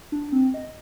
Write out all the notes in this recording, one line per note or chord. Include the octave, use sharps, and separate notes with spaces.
D4
C4
D#5